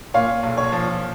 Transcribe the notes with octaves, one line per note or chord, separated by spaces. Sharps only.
A#2 C#5 F5
B1
C#5
F3